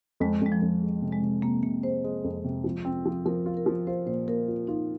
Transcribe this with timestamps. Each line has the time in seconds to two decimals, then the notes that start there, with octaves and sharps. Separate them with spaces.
0.20 F2 G#3
0.42 F2 G#3
0.52 F3
0.62 F2
0.82 G#3
1.02 C3
1.13 G#3
1.22 C3
1.42 C3 A#3
1.63 C3 A#3
1.83 G#3 C5
2.04 G#3
2.24 F2
2.44 C3
2.64 F3
2.85 C4
3.06 F3
3.26 F3 A#4
3.46 F4
3.57 A#4
3.66 F3
3.87 F4 C5
4.07 A#2 C5
4.27 A#2 A#4
4.48 F4
4.67 D#4 F4